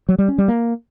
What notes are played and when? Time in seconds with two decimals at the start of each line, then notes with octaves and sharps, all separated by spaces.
0.09 F#3
0.18 G3
0.28 C#4
0.38 G3
0.48 A#3